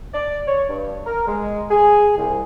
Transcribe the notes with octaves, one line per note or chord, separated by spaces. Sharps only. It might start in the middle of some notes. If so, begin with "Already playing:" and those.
D5
C#5
G2
A#4
G#3
G#4
C2